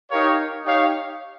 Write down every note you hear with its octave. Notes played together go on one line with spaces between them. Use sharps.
D#4 G4 A#4 C#5 F5
D#4 G4 C#5 F5